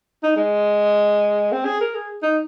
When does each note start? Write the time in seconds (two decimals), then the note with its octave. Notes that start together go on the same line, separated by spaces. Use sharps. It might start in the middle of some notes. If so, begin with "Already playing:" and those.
0.23 D#4
0.36 G#3
1.52 C4
1.65 G#4
1.81 A#4
1.95 G#4
2.23 D#4